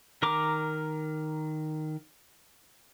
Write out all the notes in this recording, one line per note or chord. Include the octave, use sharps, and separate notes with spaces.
D#3 A#4 A#5 D6